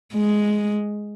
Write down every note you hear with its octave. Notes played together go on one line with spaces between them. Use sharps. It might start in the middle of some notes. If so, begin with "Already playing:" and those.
G#3